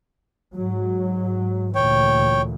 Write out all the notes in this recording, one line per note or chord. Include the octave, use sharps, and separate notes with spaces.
G#2 F#3
D2 A#2 E3 C#5 G5